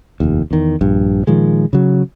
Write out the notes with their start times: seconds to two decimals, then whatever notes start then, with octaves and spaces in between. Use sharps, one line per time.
0.20 F1 D#2
0.51 E2 D#3
0.81 A#1 G2
1.27 A#2 D#3 F3 G#3
1.73 C#3 F#3